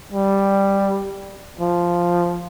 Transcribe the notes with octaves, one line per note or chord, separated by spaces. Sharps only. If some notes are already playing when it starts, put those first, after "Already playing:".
G3
F3